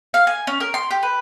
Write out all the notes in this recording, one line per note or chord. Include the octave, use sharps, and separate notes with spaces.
F5
G#5
C#4
A#4
C6
G4
B4